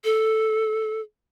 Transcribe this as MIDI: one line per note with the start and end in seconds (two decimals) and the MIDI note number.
0.04 1.01 69